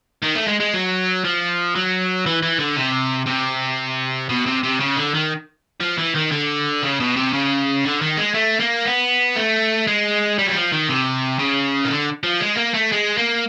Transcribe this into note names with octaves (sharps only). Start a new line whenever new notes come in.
D#3
A3
G#3
G#3
F#3
F3
F#3
E3
E3
D3
C3
C3
B2
C3
C3
C#3
D3
D#3
F3
E3
D#3
D3
C#3
B2
C3
C#3
D3
D#3
G#3
A3
A#3
B3
A3
G#3
G3
F#3
F3
D#3
C3
C#3
D#3
D3
F3
G#3
A#3
A3
G#3
A#3